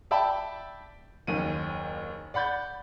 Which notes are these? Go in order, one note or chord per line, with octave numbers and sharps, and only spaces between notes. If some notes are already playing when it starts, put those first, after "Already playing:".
D5 E5 G5 A5 B5
F#1 D#2 D#3 D#7
D5 F#5 B5 G6 A6